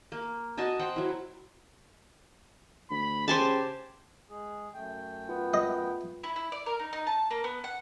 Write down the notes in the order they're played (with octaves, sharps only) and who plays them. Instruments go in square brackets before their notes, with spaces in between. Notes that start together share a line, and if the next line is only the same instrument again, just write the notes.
[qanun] A#3
F#4 D#5 G#5 A5
C5 F#5 G5
F#3 E4
[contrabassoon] D2 [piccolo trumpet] B5
[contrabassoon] C#3 [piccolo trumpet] G4 [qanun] C5 G#5 A5
[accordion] G#3 G#4
F#2 A3 G5
[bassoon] B3 [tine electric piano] F4
[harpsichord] D#5
[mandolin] E4
E4
D5
A#4
D#4
D#4
A5
A#3
B3
F#5